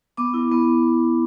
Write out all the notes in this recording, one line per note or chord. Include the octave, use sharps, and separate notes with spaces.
B3 D6
E4
B3